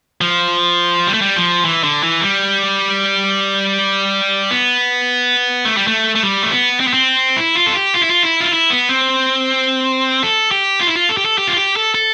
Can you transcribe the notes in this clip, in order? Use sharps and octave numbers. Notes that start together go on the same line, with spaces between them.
F3
G3
A3
G3
F3
E3
D3
E3
G3
B3
A3
G3
A3
A3
G3
A3
B3
C4
B3
C4
E4
F4
A4
G4
F4
E4
F4
E4
F4
E4
B3
C4
A4
G4
F4
E4
F4
A4
G4
A4
G4
F4
G4
A4
A4